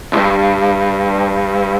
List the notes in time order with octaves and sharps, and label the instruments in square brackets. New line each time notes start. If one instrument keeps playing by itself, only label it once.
[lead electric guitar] C2 G2